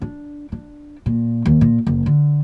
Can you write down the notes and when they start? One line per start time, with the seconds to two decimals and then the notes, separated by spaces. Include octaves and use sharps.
0.02 D4
0.52 D4
1.06 A#2
1.46 D#2
1.61 A#2
1.87 F#1
2.06 D3